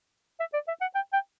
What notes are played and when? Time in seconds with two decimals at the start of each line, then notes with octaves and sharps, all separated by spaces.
0.40 E5
0.53 D5
0.68 E5
0.81 F#5
0.95 G5
1.13 G5